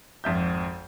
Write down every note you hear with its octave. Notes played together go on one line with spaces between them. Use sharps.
G#1 F2 E5 G6